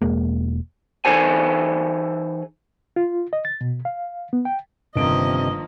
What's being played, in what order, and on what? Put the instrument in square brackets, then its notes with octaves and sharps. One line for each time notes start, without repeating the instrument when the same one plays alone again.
[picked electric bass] E1 G#3 A#3
[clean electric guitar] E3 D#4 G#4 A4 C5 G#5
[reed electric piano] F4
D#5
A6
B2
F5
B3
G5
[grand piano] G1 D7 [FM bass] C3 [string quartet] D#3 F3 A#3 [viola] D#5